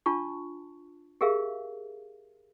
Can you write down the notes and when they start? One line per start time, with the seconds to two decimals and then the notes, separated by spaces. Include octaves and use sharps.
0.06 D4 F4 A5 C#6
1.21 G4 G#4 A#4 E5 F5